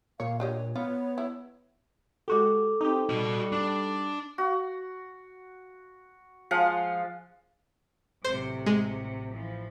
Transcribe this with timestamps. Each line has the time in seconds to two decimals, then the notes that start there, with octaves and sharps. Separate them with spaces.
0.20 A#2 C#5 F5
0.40 D4 G4 C#5 D#5
0.76 B3 F4 C#5
1.18 E4
2.28 G#3 F#4 G4 A4 D6
2.81 C4 D#4 G4
3.10 G3 F#4 D#5
3.52 D4
4.38 F#4
6.51 F3 G#3 F5 F#5
8.24 A1 C3 F#3 C5
8.66 G#3
9.30 E3 F3